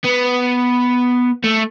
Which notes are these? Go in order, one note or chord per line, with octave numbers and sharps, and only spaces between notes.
B3
A3